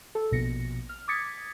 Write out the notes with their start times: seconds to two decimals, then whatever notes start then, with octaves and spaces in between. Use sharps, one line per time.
0.15 A4
0.31 A#1 B2 A#6 C#7
0.89 F6
1.08 D6 D#6 G#6 A6 B6 C#7